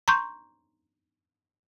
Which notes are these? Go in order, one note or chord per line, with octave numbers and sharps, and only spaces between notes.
A#5 C6 C#6 G6